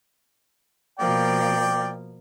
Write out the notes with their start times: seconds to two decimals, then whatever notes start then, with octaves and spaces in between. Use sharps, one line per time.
0.99 B2 F3 A#3 D5 G5